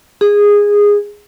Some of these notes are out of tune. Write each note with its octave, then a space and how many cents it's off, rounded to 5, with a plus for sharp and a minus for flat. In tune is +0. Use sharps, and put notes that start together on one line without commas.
G#4 -15